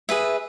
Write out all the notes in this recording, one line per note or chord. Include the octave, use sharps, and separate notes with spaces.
G#4 B4 E5